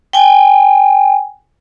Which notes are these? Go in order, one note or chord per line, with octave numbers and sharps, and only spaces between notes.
G5 G#5